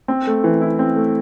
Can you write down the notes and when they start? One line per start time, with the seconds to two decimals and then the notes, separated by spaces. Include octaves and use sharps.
0.08 C4
0.27 A3
0.44 E3
0.61 E4
0.79 C4
0.96 A3